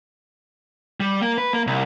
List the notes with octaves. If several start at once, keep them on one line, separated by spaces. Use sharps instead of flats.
G3
A#3
B4
A#3
C2